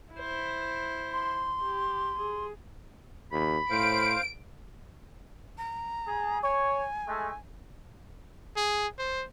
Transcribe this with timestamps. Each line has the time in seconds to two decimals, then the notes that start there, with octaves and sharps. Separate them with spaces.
0.14 E4 C5
1.11 C6
1.61 G4
2.18 G#4
3.32 D#2 B5
3.70 A2 C5 F5 D7
5.58 A#5
6.08 G#4
6.43 C#5 G#5
7.08 G#3 A3
8.57 G#4
8.98 C5